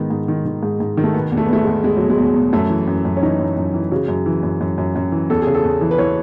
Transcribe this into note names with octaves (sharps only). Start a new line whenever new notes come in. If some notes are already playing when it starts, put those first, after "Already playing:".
Already playing: G#2 D#3 B3
G#2
D#3
D#3
G#2
G#2
D#3
A3
B2 B3
E2
A3
B3
E2 A3
G#3
E2
E2 G#3
B2 F#3
G#3
E2
B2
F#2 A3
E3
F#2
F#2
C#4
E3 D#4
F#2
F#2
E3
C#3 F#4
F#2
E3
F#2
F#2
F#2
F#2
E3
E2 A4
G#4
C#3
A4
E2
E3
B4
E3 C#5